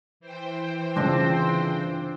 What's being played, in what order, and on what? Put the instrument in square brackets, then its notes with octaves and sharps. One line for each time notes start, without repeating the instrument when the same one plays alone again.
[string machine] E3 C5 G5
[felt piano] G1 C#3 [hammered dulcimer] F3 C4 D4